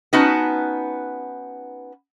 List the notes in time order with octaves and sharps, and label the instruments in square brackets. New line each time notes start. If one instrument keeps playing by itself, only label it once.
[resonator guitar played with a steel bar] B3 C#4 D#4 F#4 B4 A5